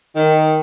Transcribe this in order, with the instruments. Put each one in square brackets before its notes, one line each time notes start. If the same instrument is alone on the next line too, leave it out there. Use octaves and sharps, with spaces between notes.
[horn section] D#3